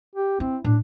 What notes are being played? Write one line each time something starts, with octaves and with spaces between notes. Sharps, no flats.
G4
C4 E4
A2 D4